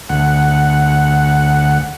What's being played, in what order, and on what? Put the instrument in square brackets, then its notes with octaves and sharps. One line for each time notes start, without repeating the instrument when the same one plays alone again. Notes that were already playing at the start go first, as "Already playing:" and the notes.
[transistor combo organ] D2 F#5